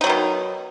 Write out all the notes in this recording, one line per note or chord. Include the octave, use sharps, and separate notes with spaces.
B2 D#3 F#3 D#4